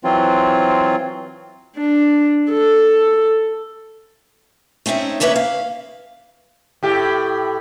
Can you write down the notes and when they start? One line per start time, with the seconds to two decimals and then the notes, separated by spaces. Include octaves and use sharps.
0.04 E3 F#3 C4 F4
1.77 D4
2.52 A4
4.86 A3 C4 C#4 D#4 E5
5.20 F2 C#3 A#3 C#4 B4 E5
5.36 F5
6.83 A2 G4 E5